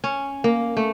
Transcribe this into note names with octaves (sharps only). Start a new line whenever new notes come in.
C#4
A#3
A3